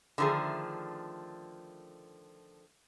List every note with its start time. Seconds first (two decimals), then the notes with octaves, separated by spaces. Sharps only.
0.18 D3 D#3 F3 A3 G#4